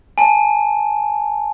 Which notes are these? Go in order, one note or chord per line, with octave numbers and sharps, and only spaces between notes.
G#5 A5